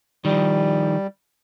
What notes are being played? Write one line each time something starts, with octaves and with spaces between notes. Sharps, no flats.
D#3 F3 G3